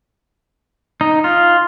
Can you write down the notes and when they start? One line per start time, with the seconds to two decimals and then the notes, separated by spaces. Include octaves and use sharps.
1.01 D#4
1.24 F4